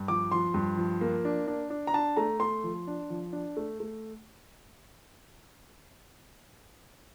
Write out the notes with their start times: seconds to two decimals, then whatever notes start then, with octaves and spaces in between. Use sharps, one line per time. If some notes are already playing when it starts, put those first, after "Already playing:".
Already playing: G2
0.08 F3 D6
0.32 F3 C6
0.54 G2
0.77 F3
1.01 A#3
1.25 D4
1.47 D4
1.70 D4
1.87 A#5
1.94 D4 A5
2.17 A3 A#5
2.40 A3 C6
2.64 F3
2.87 D4
3.10 F3
3.33 D4
3.57 A3
3.80 A3